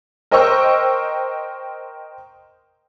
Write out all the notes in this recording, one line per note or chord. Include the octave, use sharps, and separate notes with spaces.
A#4 C5 D#5 G5 C#6 E6